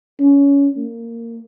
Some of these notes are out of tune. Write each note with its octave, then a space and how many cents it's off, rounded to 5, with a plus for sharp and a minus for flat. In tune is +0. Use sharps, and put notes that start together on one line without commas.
C#4 +20
A#3 -15